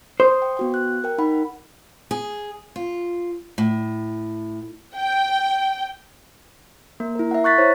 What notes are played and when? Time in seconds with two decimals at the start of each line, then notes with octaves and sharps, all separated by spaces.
0.20 C5 D#6
0.42 G5
0.57 B3 F#4 G5
0.74 F#6
1.04 A#4 G5
1.18 D#4 F#5 B5
2.11 G#4
2.76 F4
3.58 A2
4.96 G5
7.00 A#3 A#4
7.15 E4 A#4
7.31 E5 F#5
7.44 C#6 F#6 A6 B6
7.58 E4 C5 C#5